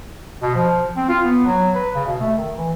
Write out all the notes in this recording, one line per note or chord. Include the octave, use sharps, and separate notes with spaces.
B2
F3
C4
F4
B3
F#3
B4
C#3
B2
A3
D#3
E3